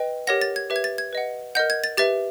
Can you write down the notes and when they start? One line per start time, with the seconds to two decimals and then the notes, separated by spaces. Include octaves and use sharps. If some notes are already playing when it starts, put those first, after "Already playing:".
Already playing: B4 D#5 G5
0.27 G4 A#4 C#5 F#5 A#6
0.41 A6
0.56 G#6
0.70 G4 B4 E5
0.76 G#6
0.84 A6
0.98 G#6
1.13 B4 D#5 F#5
1.55 A#4 D#5 F#5 G6
1.70 G#6
1.84 A6
1.97 G4 B4 E5 A6